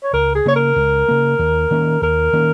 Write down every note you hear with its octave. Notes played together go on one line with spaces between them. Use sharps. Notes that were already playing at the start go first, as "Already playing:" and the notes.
C#5
C#2 A#4
G#4
C#3 A#3 C#5
A#4
C#2
C#3 A#3
D#2
D#3 A#3 C#4
D#2 A#4
D#3 A#3 C#4